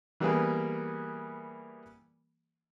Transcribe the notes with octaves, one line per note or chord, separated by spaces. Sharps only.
E3 G3 A#3 B3 G#4 B4